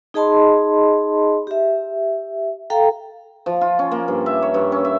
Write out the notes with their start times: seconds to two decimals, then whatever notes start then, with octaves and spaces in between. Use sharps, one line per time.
0.14 D#4 G#4 D#5 A5 B5 C6
1.47 G4 E5
2.70 A4 F5 G5 A#5
3.46 F3
3.61 F4
3.79 C#4
3.92 A#3
4.08 G2
4.26 E5
4.42 C#5
4.54 G2
4.72 C#4
4.85 E5